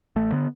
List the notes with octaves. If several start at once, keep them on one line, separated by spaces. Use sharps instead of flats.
A1 A3
D3 B3